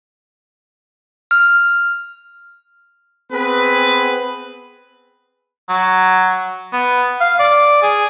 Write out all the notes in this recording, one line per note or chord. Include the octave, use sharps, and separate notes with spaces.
F6
B3 C4 G#4 B4
F#3
B3
F5
D5
G#4